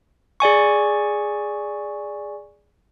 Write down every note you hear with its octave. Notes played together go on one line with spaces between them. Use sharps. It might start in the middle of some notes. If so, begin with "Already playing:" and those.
G#4 D5 G#5 C#6